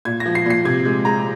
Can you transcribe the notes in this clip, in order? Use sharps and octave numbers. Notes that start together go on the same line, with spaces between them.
A#2 G#6
A#6
F3
C7
A#2 C7
C3 G#6
G#3
G#3 A#5